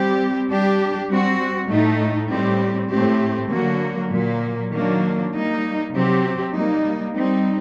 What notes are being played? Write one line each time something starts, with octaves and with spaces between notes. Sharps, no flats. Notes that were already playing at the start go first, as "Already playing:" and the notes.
Already playing: G3 C4 G4
G3 D4 G4
G3 C4 F#4
A2 A3 D#4
A2 G3 C4 G4
A2 A3 C4 G4
D3 F#3 A#3 F#4
A#2 F#3 A#3
D#3 F#3 A#3 D4
G3 A#3 D#4
C3 F#3 C4 G4
G3 A#3 D#4
G3 C4 D#4